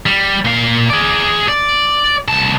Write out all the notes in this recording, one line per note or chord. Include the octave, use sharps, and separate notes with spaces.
G3
A#2 F5
G#4 D5
D5
C2 A5